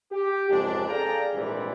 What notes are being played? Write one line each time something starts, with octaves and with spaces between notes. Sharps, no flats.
G4
F#1 F2 G#2 F3 D4
G#4 A4 D5 F5 G5 A#5
A#1 G#2 C3 E3 G3